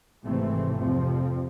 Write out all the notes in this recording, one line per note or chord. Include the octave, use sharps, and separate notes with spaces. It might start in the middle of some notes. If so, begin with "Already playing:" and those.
G#1 A2 C3 E3 A3 C4
F2 C3 F3 C4